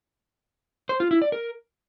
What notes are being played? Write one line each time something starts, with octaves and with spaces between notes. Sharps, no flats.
C5
F4
E4
D5
A#4